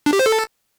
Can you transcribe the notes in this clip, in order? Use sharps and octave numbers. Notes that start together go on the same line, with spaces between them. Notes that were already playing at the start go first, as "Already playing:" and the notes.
D4
G4
C5
A4